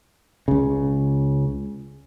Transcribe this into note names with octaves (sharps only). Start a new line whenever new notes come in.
C#2 C#3